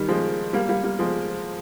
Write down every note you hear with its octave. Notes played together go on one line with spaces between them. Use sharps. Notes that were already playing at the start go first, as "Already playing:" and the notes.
Already playing: D#3 G3
F3 G#3
G3 A#3
G3 A#3
G3 A#3
F3 G#3